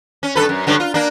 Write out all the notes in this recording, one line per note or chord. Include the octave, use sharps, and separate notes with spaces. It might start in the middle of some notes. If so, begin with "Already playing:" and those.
C#4
G2 A4 B4
F#2
G2 D3 F#3
F4
A#3 D4